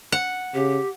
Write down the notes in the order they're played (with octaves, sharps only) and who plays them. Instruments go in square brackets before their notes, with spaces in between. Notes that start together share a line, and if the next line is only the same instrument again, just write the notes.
[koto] F#5
[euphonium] C#3 [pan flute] G4